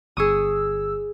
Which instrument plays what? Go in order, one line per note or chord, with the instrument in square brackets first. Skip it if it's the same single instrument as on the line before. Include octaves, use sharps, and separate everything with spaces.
[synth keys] G1 E6 [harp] G#4 C#6 D#6